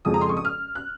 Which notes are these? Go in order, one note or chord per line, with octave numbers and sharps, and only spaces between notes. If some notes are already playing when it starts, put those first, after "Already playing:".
F2 C#3 F3 G#3 D#6
A#5
C6
C#6
D#6
F6
F#6